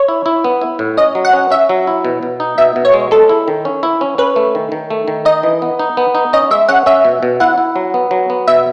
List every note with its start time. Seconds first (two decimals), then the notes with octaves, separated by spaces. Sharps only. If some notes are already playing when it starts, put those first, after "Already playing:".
Already playing: C#5
0.08 E4
0.26 E4
0.44 B3
0.61 E4
0.79 A2
0.97 C#4 D#5
1.15 F#3
1.25 F#5
1.33 C#4
1.51 C#4 E5
1.69 F#3
1.87 E4
2.05 B2
2.23 B2
2.40 D#4
2.58 B2 E5
2.76 B2
2.85 C#5
2.94 G#3
3.11 G#3 A4
3.29 E4
3.48 D#3
3.65 C#4
3.83 E4
4.01 C#4
4.18 C#4 B4
4.36 A3
4.55 D#3
4.72 D#3
4.90 A3
5.08 D#3
5.25 D#4 D#5
5.43 E3
5.62 B3
5.79 D#4
5.97 B3
6.15 D#4
6.33 C#4 D#5
6.51 G#3 E5
6.69 C#4 F#5
6.86 C#4 E5
7.05 B2
7.23 B2
7.40 E4 F#5
7.58 E4
7.76 F#3
7.94 B3
8.11 F#3
8.30 B3
8.48 B2 E5